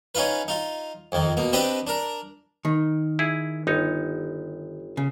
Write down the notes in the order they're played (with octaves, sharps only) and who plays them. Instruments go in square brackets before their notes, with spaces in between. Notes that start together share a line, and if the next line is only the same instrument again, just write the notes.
[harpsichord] C#4 D#4 F4 B4
D#4 F4
F2 D#3
B2 A#3
C4 D4 G4 B4 D#5 G5
D4 A#4
[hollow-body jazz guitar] D#3
[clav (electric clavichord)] E4 G#4
G1 D#4 C#5
[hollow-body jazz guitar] C#3